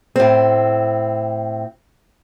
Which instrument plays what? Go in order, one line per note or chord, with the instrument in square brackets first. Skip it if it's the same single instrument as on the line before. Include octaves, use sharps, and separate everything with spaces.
[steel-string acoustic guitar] A2 C4